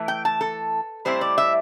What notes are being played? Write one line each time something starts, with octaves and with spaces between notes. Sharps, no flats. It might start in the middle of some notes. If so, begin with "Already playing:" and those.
Already playing: E3 A3 E4
G5
A5
A4
A2 G3 C4 E4 C5
D5
E5